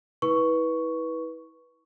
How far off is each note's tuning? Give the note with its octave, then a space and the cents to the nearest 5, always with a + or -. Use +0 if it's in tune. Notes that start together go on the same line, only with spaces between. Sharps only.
E4 -35 B4 -15 C#6 +5